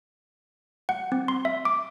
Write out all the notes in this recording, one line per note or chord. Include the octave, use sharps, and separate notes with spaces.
F#5
C4
C6
E5
D6